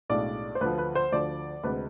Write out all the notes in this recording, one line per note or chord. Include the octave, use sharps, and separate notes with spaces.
B1 A2 G#3 D4 D5
C5
D2 D3 F3 B4
B4
C5
D2 D3 F3 D5
D2 C3 G#3 B4